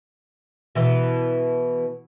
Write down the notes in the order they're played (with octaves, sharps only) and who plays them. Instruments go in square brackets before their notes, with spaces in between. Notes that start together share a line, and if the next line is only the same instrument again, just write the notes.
[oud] B2 E3